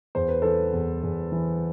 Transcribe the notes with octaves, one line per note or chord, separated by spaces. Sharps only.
E2 C5
B4
E3 A4 C5
E2
E2
E3